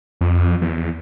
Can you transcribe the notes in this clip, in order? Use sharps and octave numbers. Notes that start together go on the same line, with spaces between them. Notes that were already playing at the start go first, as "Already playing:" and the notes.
F2
E2